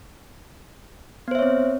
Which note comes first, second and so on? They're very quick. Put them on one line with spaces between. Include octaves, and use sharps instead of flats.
B3 C5 E5 C#5 C4